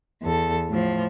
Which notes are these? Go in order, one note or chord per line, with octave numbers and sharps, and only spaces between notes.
E2 A4
A2 F3